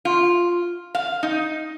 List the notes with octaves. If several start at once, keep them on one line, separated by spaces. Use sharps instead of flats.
F4
F5
D#4